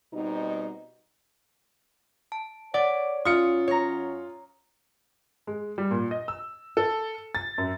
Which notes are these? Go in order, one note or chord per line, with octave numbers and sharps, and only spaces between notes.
B2 G3 C4 D#4
A5
C#5 D5 F#5 D6
F#2 F#3 C#4 F4 D#6 F6 C#7
C#5 A#5
G#3
G3
A#2
D#5
E6
A4
A6
F#2